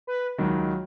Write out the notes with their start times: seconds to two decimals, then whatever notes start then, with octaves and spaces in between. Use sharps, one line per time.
0.07 B4
0.38 C#2 D#3 F#3